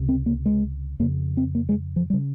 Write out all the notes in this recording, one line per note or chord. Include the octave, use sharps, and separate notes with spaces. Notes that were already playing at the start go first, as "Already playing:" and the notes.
Already playing: C#2 C3
C4
A#3
G#3
F2 C#3 A#3
C4
A#3
G#3
F3
G3
C#3